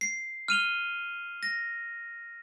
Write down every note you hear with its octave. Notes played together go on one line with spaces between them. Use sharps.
C7
F6 D#7 F7 G7
A#6